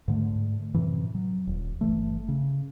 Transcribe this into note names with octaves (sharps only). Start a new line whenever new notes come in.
G#2 D3 A3
F#2 A2 C3 E3
F#3
D#1
G1 F2 E3 A3
C#3